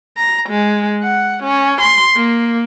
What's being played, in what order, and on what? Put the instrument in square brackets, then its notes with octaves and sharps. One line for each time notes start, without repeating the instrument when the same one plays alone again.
[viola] A#5
G#3
F#5
C#4
C6
A#3